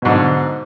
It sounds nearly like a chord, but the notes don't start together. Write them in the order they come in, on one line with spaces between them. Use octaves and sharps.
B2 G#2 D3